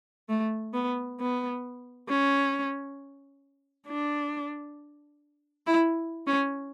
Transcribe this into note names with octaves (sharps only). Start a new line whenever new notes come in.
A3
B3
B3
C#4
D4
E4
C#4